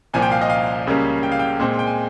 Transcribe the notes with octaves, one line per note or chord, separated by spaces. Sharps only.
C2 A#2 F3 G#5
G5
F5
D#5
F5
C#2 C#3 G3 A#3 C#4
G5
F5
G5
A#2 G#3 C4
G5
G#5